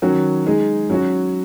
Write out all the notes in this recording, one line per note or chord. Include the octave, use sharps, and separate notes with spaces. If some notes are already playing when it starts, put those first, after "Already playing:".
D#3 F#3 C#4 F#4
G#3 D#4 G#4
F#3 C#4 F#4